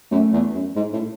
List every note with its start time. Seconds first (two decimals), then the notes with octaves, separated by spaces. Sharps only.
0.11 F#2 A3
0.33 E2
0.54 F#2
0.76 G#2
0.93 A2